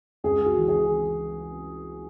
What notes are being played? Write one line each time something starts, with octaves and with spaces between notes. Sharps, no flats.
C#2 G#4
F#4
E3
G#4